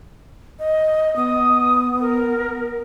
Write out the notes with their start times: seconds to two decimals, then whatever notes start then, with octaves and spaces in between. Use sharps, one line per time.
0.59 D#5
1.16 B3 D#6
2.00 A#4